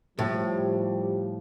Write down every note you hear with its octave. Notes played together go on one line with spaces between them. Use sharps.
A2 F3 G3 G4